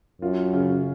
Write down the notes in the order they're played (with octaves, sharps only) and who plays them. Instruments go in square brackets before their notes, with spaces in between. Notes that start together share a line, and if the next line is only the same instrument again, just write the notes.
[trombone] F#2 [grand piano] F4
[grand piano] C#3